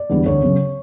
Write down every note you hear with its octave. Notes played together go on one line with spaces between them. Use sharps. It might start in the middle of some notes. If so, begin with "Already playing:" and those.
Already playing: D5
E2 D3 G3
D2 C#5
C#3 F#3